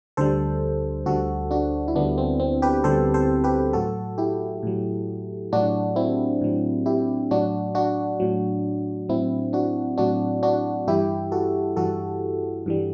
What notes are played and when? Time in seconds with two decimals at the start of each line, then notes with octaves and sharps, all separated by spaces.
0.17 D2 D3 G3 A4 C5
1.06 D2 D3 G3 F#4 A4
1.51 D4 F#4
1.88 E4
1.95 D2 D3 G3 B3 D4
2.18 C4
2.40 C4
2.62 G4 B4
2.84 D2 D3 G3 A4 C5
3.14 A4 C5
3.44 G4 B4
3.73 A2 F#3 F#4 A4
4.18 E4 G4
4.63 A2 F#3
5.53 A2 F#3 D4 F#4
5.96 C4 E4
6.41 A2 F#3
6.86 E4 G4
7.31 A2 F#3 D4 F#4
7.75 D4 F#4
8.20 A2 F#3
9.09 A2 F#3 C4 E4
9.53 D4 F#4
9.98 A2 F#3 D4 F#4
10.43 D4 F#4
10.87 G2 E3 G3 E4 G4
11.32 F#4 A4
11.77 G2 E3 G3 F#4 A4
12.66 G2 E3 G3